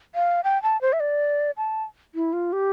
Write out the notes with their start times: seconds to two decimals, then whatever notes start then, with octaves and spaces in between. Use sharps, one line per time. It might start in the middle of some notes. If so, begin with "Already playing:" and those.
0.15 F5
0.44 G5
0.63 A5
0.81 C5
0.93 E5
1.00 D5
1.57 A5
2.15 E4
2.33 F4
2.53 G4